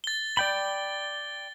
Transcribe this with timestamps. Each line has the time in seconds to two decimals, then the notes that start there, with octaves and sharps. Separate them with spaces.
0.04 A6 G7
0.37 D5 G5 B5 G7